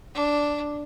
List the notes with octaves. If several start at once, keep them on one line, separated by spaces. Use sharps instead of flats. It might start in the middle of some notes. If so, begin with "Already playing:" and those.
D4